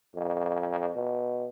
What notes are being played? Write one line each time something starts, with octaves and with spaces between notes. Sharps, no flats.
F2
B2